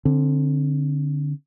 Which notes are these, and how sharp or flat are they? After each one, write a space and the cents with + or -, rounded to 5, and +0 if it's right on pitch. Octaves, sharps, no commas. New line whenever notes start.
D3 +0 C4 +25